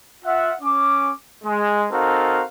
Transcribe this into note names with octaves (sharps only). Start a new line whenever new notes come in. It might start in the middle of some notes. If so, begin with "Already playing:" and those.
F4 E5 F#5
C#4 D6
G#3
C4 D#4 F#4 A4 A#4 F5